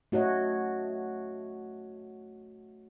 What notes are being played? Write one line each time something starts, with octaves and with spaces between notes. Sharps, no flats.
A3 F#4 C#5 D#5